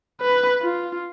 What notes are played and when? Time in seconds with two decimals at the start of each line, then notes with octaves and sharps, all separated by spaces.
0.21 B4
0.62 F4